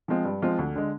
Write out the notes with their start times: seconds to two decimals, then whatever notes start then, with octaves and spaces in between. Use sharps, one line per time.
0.08 F3 G#3 C4 F4
0.25 G2
0.42 F3 G#3 C4 F4
0.58 D2
0.75 D3 G#3